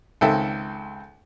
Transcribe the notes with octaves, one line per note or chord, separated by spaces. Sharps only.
C#2 D#3 C4 A4 E5